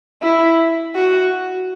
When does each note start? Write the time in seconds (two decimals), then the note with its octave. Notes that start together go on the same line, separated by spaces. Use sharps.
0.22 E4
0.95 F#4